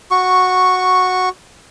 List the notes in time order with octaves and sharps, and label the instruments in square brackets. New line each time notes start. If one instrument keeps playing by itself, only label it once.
[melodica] F#4 C#6